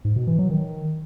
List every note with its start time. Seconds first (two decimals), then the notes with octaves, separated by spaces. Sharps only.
0.05 G#2
0.16 B2
0.27 E3
0.39 F#3
0.50 D#3